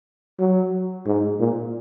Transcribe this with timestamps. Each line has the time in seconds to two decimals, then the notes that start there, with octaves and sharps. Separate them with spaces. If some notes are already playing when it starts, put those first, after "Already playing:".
0.39 F#3
1.06 G#2
1.40 A#2